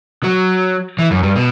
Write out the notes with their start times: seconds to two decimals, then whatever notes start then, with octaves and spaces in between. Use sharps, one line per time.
0.23 F#3
0.98 E3
1.11 F#2
1.23 G2
1.36 B2